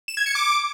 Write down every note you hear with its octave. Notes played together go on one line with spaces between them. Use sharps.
E7
G#6
C#7
D6